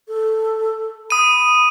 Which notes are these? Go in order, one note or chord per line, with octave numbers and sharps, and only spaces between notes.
A4
B5 D#6 D#7